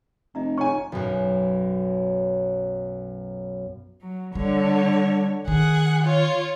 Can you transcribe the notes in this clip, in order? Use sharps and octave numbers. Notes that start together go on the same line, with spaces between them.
F1 D#5 E5 A#5
D#4 C#5 G#5 A#5 C#6
B1 F#2
F#3
D3 G3 C#5
D#3 G#4 F#5
F4 C#5